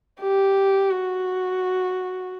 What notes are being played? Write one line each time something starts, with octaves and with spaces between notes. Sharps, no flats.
G4
F#4